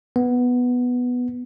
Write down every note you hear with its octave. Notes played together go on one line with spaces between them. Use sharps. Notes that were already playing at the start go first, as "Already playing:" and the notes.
B3